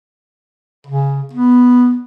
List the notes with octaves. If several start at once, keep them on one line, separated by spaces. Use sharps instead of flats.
C#3
B3